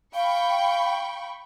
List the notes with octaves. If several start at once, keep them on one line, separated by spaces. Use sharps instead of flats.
F5 G5 B5 C#6